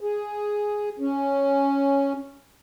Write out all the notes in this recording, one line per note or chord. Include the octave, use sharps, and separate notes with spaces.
G#4
C#4